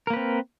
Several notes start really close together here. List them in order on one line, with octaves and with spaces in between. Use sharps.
A#4 A#3 B4 C4